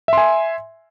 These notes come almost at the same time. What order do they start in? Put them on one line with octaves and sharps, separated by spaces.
E5 C6 G#5